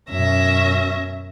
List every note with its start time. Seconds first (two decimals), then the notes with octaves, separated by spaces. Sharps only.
0.10 F#2 B2 C#4 E5 A#6